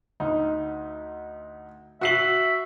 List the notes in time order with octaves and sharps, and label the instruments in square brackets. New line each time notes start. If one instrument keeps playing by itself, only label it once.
[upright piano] D2 D#4
[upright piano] F#4 C7 F#7 [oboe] E5